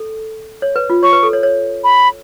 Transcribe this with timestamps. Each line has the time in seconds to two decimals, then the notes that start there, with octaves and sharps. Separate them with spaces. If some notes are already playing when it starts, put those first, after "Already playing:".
Already playing: A4
0.62 C#5
0.76 B4
0.90 F4
1.03 C#5 C#6
1.13 B4
1.23 A4
1.33 C#5
1.43 C#5
1.84 B5